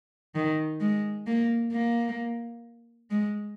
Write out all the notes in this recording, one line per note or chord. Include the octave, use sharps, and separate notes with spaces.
D#3
G#3
A#3
A#3
G#3